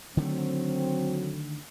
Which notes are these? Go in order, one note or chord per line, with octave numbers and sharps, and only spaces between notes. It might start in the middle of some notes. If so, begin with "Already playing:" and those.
D3 D#3 F#3 A3 C4